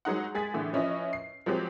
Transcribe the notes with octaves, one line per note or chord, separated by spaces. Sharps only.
F#3 G#3 D#4 F#5
G#3 G#4 A6 B6
A2 D3 E3
F3 C#4 E4 B4 D#5
C7
F3 F#3 G#3 C4 G4